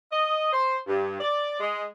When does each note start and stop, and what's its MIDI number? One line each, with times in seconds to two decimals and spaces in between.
0.12 0.52 75
0.52 0.77 72
0.87 1.17 43
1.20 1.58 74
1.60 1.84 56